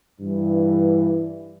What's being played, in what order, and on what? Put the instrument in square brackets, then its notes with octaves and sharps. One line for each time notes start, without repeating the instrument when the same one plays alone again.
[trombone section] G2 E3